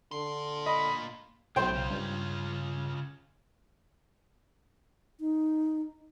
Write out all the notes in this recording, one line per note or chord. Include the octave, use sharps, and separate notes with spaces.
A#2 D3 C6
D#5 B5
B1 G#3 A3 E4 C5 G5
C#3 C#4 F4
G2
D#4